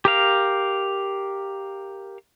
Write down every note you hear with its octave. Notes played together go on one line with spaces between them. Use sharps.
G4 A#4 F5